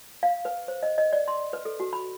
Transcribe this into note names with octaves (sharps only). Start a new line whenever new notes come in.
F5
B4
C5
D#5
D#5
D5
C6
B4
A4
F#4
B5